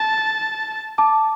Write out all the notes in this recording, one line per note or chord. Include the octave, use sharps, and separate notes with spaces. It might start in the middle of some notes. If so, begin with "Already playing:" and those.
Already playing: A5
A5 D6